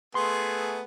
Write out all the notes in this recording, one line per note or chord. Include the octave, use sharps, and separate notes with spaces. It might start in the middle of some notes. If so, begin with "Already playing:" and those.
A3 B3 G#4 C6